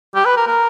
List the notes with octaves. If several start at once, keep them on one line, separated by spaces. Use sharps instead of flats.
G4
B4
A#4
A#4